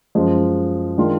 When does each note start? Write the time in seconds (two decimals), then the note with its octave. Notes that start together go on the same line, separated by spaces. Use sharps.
0.15 F#2 F3 G#3
0.98 D#3 G#3 D4 F4